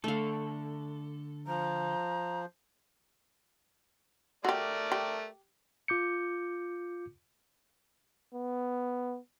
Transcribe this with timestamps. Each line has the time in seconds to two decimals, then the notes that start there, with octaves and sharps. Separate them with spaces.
0.04 D3 A3 A4 F5
1.47 F3 A#5
4.45 A3 F#4 G4 A#4 D5
4.92 G4
5.88 F4 D6 G6 C#7
8.34 B3